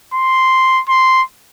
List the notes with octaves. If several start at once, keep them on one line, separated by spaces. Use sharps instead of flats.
C6
C6